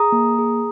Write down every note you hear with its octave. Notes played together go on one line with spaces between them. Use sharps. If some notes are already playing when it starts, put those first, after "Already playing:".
Already playing: G#4 A#5 D#6
A#3
G#4